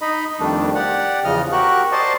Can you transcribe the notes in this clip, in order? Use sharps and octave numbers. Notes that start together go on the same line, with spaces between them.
D#4 D#5 B5
F2 D#3 G3 A3 D4
G4 D5 F#5
E2 C#3 F3 D#5 F6
F#4 G4 A#4 C#6 F#6
C5 D5 D#5 A5 C6 C#6